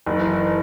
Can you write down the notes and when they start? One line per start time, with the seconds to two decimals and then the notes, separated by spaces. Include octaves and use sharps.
0.06 F#1 D#3
0.17 E3
0.28 D#3